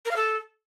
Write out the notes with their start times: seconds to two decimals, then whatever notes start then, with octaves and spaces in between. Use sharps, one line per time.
0.06 A#4
0.11 F5
0.16 A4